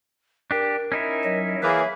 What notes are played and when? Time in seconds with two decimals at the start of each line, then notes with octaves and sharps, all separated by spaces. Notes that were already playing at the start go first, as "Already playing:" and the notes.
0.51 D4 G4 A#4
0.92 C#4 D#4 E4
1.25 F#3 D#5
1.63 E3 A#3 G#4 C#5 E5